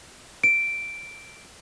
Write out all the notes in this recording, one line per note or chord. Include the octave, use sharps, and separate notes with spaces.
D7